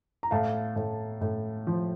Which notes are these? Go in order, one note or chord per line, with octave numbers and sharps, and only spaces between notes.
A#5
A2 F5 A5
A2
A2
F3